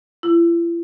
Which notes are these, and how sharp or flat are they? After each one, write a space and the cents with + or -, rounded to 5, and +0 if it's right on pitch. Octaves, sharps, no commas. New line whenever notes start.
E4 +45